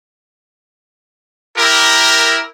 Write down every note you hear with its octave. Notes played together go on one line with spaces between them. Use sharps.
E4 G4 A#4